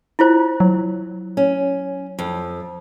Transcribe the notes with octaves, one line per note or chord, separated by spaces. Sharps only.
E4 F4 C5
F#3
C#4
F2